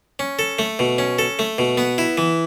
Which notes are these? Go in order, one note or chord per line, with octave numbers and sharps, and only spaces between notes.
C#4
A4
A3
B2
C#4
A4
A3
B2
B3
E4
E3